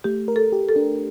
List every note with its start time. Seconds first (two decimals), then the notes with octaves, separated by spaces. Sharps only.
0.04 A3 G4
0.28 A#4
0.36 A4
0.52 G4
0.69 A4
0.76 D4